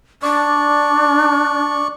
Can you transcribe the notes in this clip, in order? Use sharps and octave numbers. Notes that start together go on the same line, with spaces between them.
D4 D5 C#6